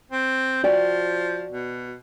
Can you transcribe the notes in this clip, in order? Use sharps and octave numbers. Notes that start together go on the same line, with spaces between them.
C4
F3 F#4 D5 G5
B2